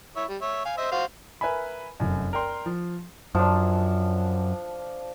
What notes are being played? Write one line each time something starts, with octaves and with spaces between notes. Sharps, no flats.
E4 C#5 E5
G3
C#5 E5
F5 G#5
C5 D#5 E5
F#4 C5 F5
A#4 B4 E5 G#5 B5
F1 F#2
A#4 D5 G5 C6
F3
F#2 F3 D4